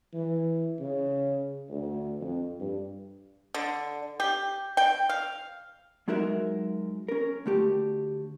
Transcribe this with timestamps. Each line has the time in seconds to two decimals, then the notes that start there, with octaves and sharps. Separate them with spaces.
0.13 E3
0.80 C#3
1.69 D2
2.21 F2
2.60 G2
3.54 D3
4.20 G4
4.77 G5
5.09 F5
6.08 F#3 G#3 D#4 F#4 A#4 E5
7.08 C#4 A#4
7.46 D2 A3 G4